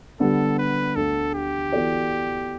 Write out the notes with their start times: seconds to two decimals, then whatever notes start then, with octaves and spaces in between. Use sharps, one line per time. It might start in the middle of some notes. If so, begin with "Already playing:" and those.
0.20 D3 G3 B3 D4 A4
0.59 B4
0.96 D2 D3 A3 A4
1.34 G4
1.72 E3 B3 F#4 A4 D5